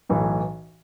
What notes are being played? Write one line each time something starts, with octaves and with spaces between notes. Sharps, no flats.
B1 A2 E3